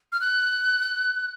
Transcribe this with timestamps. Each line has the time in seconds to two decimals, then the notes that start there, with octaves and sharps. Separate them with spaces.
0.12 F6
0.21 F#6